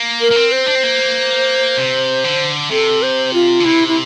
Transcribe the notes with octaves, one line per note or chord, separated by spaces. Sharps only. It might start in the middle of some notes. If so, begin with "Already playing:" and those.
Already playing: A#3
A#4
A#3
C4
C5
D4
C4
A#3
C3
D3
C3 A4
C5
F4
D3
C3 E4
E4